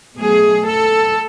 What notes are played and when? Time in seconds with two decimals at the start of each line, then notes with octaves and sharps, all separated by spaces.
0.16 B2 F#3 A3 G#4
0.64 A4